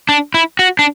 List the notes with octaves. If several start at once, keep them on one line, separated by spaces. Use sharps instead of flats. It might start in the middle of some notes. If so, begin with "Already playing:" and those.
D4
E4
F#4
D4